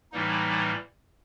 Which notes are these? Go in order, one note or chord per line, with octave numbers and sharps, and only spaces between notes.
A2 E3 G3 A#3 D#4